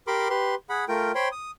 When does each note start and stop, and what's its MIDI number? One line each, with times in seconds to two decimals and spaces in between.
0.07 0.28 67
0.07 0.28 70
0.07 0.28 83
0.07 0.28 84
0.07 0.28 86
0.30 0.55 67
0.30 0.55 71
0.30 0.55 84
0.69 0.85 68
0.69 0.85 78
0.69 0.85 83
0.88 1.12 57
0.88 1.12 65
0.88 1.12 70
0.88 1.12 79
1.15 1.28 72
1.15 1.28 73
1.15 1.28 79
1.15 1.28 83
1.15 1.28 84
1.32 1.51 87